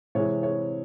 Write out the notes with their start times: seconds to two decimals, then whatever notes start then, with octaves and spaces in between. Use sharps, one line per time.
0.15 C3 E3 G#3 C4 E4 C#5
0.43 C#5